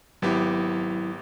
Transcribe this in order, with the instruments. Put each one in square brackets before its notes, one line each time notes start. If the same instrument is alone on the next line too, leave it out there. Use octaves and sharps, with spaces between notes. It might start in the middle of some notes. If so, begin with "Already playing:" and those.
[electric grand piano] G#1 B3 G4 [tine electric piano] F#3 E4